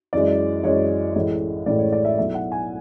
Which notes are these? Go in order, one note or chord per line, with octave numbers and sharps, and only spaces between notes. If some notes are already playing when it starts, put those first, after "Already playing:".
F#2 E3 G#3 D5
F#2 E3 G#3 C#5
A1 A2 G#3
A1 A2 G#3 D5
C#5
D5
E5
B1 A2 F#3 A3 E5
F#5
G#5